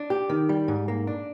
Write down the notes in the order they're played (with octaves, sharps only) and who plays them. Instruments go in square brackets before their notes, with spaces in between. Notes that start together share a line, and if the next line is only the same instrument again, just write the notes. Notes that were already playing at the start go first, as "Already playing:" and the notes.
Already playing: [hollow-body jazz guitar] D4
G4
D#3
G3
G#2
A#3
D4